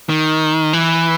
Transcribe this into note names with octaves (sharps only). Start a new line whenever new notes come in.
D#3
E3